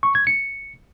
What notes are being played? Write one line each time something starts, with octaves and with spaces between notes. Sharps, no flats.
C#6
G#6
C#7